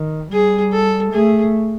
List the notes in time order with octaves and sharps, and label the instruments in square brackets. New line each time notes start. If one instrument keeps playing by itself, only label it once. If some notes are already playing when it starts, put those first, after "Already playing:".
Already playing: [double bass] D#3
[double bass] G3 [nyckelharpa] G#4
[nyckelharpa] A4
[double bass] A3 [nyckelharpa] G#4